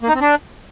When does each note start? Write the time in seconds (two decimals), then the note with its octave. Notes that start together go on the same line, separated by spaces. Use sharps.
0.02 A#3
0.08 D#4
0.15 C4
0.21 D4